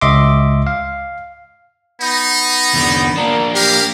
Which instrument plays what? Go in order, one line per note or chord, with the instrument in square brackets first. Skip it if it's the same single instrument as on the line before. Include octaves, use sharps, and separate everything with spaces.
[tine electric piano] C#2 D#5 E5 C6 D6
F5
[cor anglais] B3 [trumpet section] D#4
[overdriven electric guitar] E2 D3
[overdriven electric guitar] A#3 D4 [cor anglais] A#4
[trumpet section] E4 A#4 F5 [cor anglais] G4